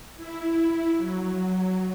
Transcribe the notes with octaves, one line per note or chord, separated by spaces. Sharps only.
E4
F#3